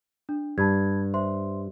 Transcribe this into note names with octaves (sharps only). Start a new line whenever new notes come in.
D4
G2 A5 B5 G#6
C5 E5 C6